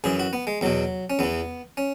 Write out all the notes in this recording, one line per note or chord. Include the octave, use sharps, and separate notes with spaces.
F#2 E3 G#4
F#4
B3
G#3
E2 B2 F#3
C#4
E2 E3 B3
C#4